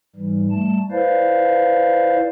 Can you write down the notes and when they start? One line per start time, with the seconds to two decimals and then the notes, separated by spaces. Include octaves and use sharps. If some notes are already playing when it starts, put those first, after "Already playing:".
0.16 G#2 E3 G3
0.51 G3 A3 A5
0.91 E4 B4 C5 D5 F5